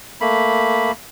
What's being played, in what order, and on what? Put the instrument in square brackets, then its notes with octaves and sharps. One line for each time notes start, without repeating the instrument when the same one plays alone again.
[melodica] A3 A#3 B5